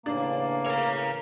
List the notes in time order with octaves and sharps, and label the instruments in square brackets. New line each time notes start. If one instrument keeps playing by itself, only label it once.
[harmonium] A2 C#3 E3 [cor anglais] A#3 [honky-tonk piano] D4
[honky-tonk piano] A#4 [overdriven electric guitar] C#5 F5